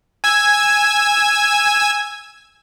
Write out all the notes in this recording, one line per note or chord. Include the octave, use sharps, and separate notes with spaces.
G#5 E6 G#6